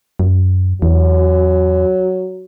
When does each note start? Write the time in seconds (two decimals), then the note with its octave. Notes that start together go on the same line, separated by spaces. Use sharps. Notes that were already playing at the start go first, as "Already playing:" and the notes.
0.19 F#2
0.82 E2 F#3